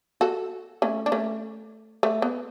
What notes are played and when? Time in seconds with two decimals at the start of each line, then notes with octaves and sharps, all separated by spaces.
0.21 F#4 A4
0.82 A3 C#4
1.06 D4
1.12 A3 C#4
2.03 A3
2.22 B3